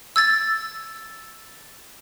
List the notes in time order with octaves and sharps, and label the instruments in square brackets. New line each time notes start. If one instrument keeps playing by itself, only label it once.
[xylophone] E6 G#6 A6